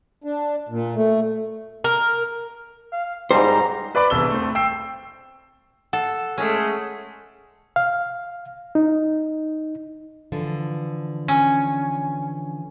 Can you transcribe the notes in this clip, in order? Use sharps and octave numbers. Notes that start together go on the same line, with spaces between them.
D4
A#2
A3
A#4
F5
G#2 G3 C5 A#5
B4 D5 B5 D6
E1 C2 E6 G7
A3 C4
G5 E6 C7
A4 F#5
G#3 A3 C#4
F5
D#4
D3 E3 F3
C#4